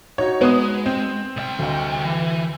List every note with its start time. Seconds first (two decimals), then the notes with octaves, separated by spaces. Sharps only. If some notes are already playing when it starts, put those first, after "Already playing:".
0.18 D#4 F#4 C#5
0.41 G#3 B3 D#6
0.86 C4
1.37 C2 G5
1.59 D2 D#5
2.05 E3